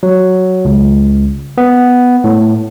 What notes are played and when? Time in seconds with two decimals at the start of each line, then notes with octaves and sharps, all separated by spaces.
0.03 F#3
0.65 C#2
1.58 B3
2.24 A2